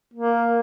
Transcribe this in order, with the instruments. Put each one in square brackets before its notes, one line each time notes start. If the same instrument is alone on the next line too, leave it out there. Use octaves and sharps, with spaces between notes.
[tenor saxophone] A#3